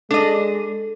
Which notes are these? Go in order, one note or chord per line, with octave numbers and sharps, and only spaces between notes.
G#3 D4 A4 D#5